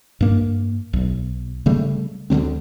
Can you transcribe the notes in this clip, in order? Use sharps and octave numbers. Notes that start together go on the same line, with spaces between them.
G2 A#3
B1
C#3 G3 A3
D2 D3 F#3 C4